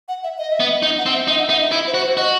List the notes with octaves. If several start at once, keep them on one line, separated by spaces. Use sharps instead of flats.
F#5
E5
D#5
E5
B3
D#5
D#4
F#5
C4
E5
D#4 E5
F#5
D#4 E5
E5
E4 E5
C5
F#4
C5
F#4 D#5